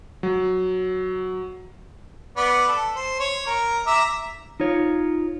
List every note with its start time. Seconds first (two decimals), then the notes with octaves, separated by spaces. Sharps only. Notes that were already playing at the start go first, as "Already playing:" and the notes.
0.23 F#3
2.37 B3 D5
2.69 A4
2.96 C5
3.19 C#5
3.47 A#4
3.87 E5 A#5 D6
4.60 D#4 F4 C#5